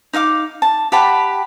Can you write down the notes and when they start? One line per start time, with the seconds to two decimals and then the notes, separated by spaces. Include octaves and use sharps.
0.13 D#4 D#5 F5 D6
0.62 A5
0.92 G4 F#5 A5 B5